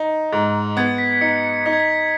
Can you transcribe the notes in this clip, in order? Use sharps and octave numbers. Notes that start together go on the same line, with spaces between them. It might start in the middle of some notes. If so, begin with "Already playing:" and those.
Already playing: D#4
G#2
B3 G#6
B6
B6
D#4 C#7
C#7
D#4 B6
G#6
B6